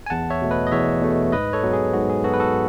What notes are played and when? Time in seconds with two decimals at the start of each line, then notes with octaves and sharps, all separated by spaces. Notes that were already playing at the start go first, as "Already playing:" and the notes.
0.06 G#5
0.10 E2 F#5 A5
0.30 C#5 E5
0.42 B2 A3
0.51 B4 D#5
0.67 D#5
0.71 E2 C#5 E5
1.02 B2 A3
1.32 G#2 B4 D#5
1.53 A4 C#5
1.63 F#3 B3
1.73 G#4
1.93 G#2 F#4
2.10 G#4
2.24 F#3 B3 F#4 A4
2.34 B4
2.40 F#4 A4